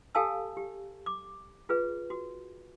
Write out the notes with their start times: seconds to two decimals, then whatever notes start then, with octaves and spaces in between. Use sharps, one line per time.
0.15 G4 A4 F5 G#5 A5 E6
0.57 G4
1.06 D6
1.69 F4 G#4 B4
2.10 F#4